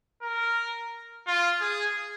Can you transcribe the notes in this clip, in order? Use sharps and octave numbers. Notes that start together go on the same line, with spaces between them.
A#4
F4
G#4